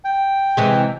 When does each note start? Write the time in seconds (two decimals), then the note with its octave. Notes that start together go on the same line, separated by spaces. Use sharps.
0.05 G5
0.57 C3 E3 G#3